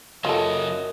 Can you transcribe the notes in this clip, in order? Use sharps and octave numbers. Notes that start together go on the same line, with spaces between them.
F#2 C#3 F#3 F4 A4 D#5